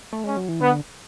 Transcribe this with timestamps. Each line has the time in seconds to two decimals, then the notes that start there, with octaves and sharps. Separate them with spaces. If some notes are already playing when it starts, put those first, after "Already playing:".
0.13 A3
0.24 G#3 C#4
0.37 F#3
0.49 E3
0.60 D3 B3